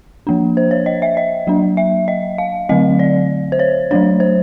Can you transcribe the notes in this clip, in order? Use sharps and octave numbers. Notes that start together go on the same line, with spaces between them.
F3 A#3 D4
C5
C#5
D#5
E5
D#5
F#3 A#3 D4
E5
D#5
F5
D3 F#3 A3 C4 D#5
D5
C5
C#5
F#3 A3 D4 C#5
C5